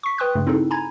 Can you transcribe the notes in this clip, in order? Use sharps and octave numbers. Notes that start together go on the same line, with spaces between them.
C#6 B6
B4 G5 C6 D#6 F#6
G2 C#3 A3
C4 D#4 E4 G#4 A4
G#5 A#5 B5 G#6